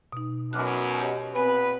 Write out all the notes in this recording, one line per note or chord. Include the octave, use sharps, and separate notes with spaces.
B2 D#4
F#2 B2 D6 F6 F#6
G4 C#5 D#5
A#2 B3 C4 B4 G#5 B5